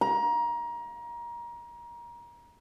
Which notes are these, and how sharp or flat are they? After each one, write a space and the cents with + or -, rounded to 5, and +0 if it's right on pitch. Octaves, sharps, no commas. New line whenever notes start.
A#5 +25